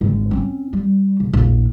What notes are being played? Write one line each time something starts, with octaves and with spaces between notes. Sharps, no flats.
G#1 D3
C4 C#4
G3
E1
A#1 E2